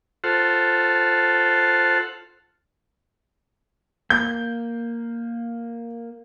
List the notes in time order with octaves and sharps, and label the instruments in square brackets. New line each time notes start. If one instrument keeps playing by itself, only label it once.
[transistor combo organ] F4 A4 C5 F#5
[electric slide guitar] A#3 [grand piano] G6